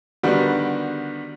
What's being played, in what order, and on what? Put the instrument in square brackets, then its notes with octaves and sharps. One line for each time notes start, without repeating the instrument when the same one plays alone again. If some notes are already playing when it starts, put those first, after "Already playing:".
[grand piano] D3 D#3 G3 B3 F#4